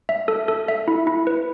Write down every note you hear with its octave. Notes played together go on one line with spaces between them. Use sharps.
E5
A4
A4
E5
E4
E4
B4